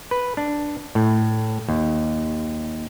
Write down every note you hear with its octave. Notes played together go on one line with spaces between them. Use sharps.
B4
D4
A2
D#2